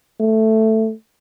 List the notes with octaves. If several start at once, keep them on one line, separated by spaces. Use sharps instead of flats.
A3